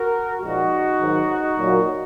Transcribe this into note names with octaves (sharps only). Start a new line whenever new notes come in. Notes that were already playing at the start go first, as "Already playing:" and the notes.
Already playing: F#4 A#4
A#2 F3 G#3 D#4 F#4
G#2 D#3 F#3
A#2 F#3 A#3